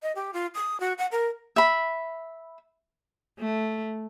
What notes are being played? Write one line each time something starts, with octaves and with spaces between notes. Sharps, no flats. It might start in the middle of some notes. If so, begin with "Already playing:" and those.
D#5
G4
F4
D#6
F#4
F#5
A#4
E5 B5
A3